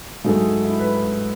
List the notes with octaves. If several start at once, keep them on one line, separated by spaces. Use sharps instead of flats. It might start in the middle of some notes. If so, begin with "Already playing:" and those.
G#2 F#3 A3 G#4
E4
B4